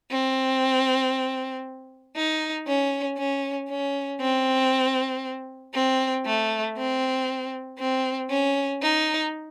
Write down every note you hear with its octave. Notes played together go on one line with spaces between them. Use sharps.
C4
D#4
C#4
C#4
C#4
C4
C4
A3
C4
C4
C#4
D#4